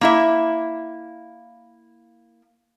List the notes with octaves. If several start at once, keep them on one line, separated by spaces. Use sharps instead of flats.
A#3 E4 E5